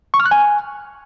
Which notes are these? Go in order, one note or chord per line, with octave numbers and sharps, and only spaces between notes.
C#6
F6
F#6
G#5